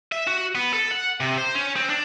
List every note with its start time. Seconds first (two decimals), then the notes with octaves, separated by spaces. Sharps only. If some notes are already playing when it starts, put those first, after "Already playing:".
0.12 E5
0.27 F#4
0.55 B3
0.73 A4
0.91 F#5
1.20 C3
1.38 C5
1.55 C#4
1.76 C4
1.89 D4